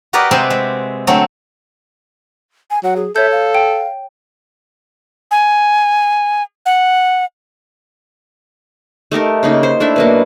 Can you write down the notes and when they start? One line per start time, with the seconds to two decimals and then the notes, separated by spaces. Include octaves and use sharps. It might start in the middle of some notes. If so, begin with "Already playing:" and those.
0.13 F#4 G4 A#4 B4 D5 D#5
0.31 C3 G#3 C4 B4 E5 C6
0.50 G#3
1.07 D3 F#3 A3 C4
2.71 G#5
2.84 F#3 F#5
2.96 G#4
3.16 A4 C#5 E5 G6
3.32 F5
3.55 G5
5.31 G#5
6.66 F#5
9.11 A3 D#4 G4 A#4
9.43 C#3 A#3 D#4
9.63 C5
9.80 A3 D4 E4 E5
9.96 B2 F#3 A#3